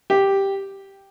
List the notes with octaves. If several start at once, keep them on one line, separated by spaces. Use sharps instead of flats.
G4